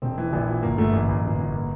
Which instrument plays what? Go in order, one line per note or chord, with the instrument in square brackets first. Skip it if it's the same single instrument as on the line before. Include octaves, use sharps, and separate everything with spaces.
[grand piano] E1 C4
E3
A#1
A#2
G1 A#3
G1 A3
A1 A#3
A1
G1
G1
A#3